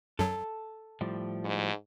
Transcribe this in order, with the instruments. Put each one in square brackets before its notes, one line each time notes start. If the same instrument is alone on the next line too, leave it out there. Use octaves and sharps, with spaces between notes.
[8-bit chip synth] F#2 F#3 [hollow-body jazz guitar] A4
[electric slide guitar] A2 F3 G3
[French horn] G#2